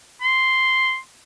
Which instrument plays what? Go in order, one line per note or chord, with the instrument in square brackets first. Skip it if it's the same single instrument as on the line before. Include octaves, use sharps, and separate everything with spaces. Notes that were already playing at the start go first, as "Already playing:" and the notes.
[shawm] C6